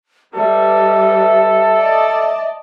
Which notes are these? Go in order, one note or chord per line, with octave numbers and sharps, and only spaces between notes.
G3 A4 B4 D#5 E5
D5 D#5 A5